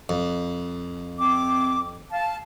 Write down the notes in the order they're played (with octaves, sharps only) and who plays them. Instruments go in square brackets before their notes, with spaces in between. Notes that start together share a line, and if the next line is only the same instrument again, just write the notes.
[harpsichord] F2
[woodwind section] C4 D6
F5 A5